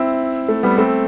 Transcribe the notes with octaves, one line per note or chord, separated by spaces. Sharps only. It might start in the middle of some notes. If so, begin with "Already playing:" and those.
Already playing: C4 E4
A3
G3 B3
A3 C4